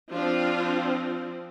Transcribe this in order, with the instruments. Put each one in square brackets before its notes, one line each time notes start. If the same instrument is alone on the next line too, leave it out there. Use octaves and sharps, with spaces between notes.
[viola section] F3 C4 D4 F4